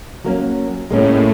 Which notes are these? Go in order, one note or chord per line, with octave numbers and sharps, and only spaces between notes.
F#3 A#3 C#4
A2 G#3 A#3 C#4